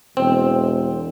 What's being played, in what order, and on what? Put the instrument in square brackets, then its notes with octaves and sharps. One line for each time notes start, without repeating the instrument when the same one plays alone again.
[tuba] E1 [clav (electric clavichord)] C4